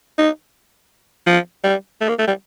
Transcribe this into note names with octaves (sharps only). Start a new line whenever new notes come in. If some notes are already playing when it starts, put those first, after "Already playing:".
D#4
F3
G3
A3
A#3
A3
G3